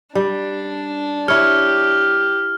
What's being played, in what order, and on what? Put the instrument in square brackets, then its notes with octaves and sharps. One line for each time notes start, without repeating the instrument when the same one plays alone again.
[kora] G3 [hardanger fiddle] D4
[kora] E4 C#5 [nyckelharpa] G4 [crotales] F6